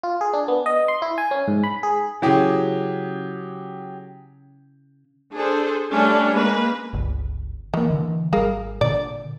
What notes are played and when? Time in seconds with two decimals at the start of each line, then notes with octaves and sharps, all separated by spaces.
0.03 F4
0.21 G#4
0.33 D4
0.48 B3
0.66 D#5
0.88 C6
1.02 E4
1.18 G#5
1.31 C#4
1.48 G#2
1.64 B5
1.83 G#4
2.22 C#3 F#3 E4 G4 G#4
5.33 D4 G#4 A4 C5
5.90 G3 A3 C#4 D4
6.33 G#3 A#3 B4
6.93 G1 C#2
7.74 D#3 E3 A#3
7.91 D3 E3
8.33 G#1 G3 G#4 A#4 F5
8.81 A#2 D3 D5